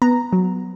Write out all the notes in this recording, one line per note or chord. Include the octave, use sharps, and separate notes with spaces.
B3 A#5
F#3